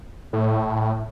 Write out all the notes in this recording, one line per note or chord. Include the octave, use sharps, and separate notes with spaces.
A2